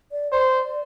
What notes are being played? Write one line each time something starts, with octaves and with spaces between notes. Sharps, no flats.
D5
C5 D5